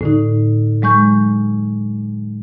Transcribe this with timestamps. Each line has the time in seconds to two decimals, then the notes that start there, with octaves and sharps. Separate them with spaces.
0.01 A2 D3 D#4
0.82 F#3 G#3 C#6 G6